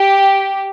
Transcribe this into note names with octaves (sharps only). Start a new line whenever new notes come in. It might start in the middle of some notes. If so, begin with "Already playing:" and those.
Already playing: G4